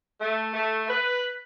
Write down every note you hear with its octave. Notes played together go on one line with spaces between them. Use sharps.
A3
A3
B4